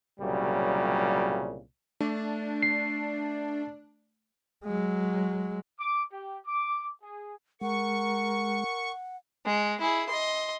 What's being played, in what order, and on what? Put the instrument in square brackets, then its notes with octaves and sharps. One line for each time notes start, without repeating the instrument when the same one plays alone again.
[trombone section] C2 A#2 C#3 F#3 G3
[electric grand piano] A3 [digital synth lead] D4
[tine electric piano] C7
[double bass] F#3 G#3
[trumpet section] D6
G4
D6
G#4
[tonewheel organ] G#3 [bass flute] A#4 [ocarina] F#5 [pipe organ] C#6
[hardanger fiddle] G#3
E4 G#4
D#5 C6